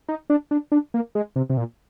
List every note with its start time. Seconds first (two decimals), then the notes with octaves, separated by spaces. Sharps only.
0.08 D#4
0.30 D4
0.51 D4
0.72 D4
0.94 A#3
1.15 G#3
1.36 C3
1.50 C3
1.57 A#2